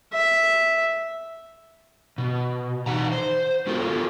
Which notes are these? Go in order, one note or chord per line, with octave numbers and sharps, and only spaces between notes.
E5
B2
E3 D#4 F#5 A#5
C5
B3 F4 F#4 A4 A#4